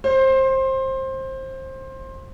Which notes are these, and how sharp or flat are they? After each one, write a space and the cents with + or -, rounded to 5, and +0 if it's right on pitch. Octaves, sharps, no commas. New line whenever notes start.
C5 +20